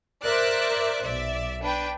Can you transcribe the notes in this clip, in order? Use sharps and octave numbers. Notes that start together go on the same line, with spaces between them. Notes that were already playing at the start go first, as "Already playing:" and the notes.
A#4 C5 D5 E5 F#6
B1 D5 E5
D4 B4 G5